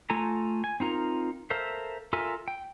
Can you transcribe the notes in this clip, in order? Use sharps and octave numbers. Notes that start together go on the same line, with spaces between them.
A3 F4 A4 G#5 A#5
G#5
C4 D#4 F4 A#4
A4 A#4 C5 E5 F5
F4 A4 A#4 E5 G#5
G5